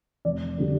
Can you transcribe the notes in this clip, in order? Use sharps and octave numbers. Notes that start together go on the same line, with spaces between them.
F1 D5
D3 G3